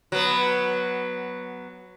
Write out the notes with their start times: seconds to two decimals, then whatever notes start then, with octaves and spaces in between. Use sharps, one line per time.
0.12 F#3 B3